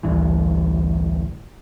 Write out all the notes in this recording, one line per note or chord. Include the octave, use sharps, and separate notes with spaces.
A1 D2 G2 E3